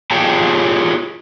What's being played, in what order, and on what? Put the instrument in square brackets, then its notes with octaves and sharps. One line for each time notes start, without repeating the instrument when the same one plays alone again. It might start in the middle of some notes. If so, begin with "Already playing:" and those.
[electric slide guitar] F4 G4 G#4 C#5 G5 A5